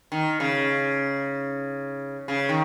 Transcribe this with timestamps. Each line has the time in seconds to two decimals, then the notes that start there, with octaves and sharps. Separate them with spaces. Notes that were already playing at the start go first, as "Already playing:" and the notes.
0.12 D#3
0.40 C#3
2.28 C#3
2.49 D#3